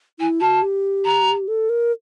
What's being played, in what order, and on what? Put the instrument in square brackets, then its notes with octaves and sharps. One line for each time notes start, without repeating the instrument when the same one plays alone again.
[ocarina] E4 [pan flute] G#5
[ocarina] F#4 [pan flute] A5
[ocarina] G4
[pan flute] A#5
[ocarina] A4
A#4